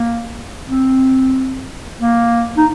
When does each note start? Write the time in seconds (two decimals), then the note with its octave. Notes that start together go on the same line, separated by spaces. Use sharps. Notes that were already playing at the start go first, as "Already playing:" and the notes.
Already playing: A#3
0.68 C4
2.00 A#3
2.57 D#4